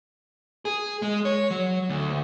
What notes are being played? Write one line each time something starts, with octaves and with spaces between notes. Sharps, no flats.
G#4
G#3
C#5
F#3
D2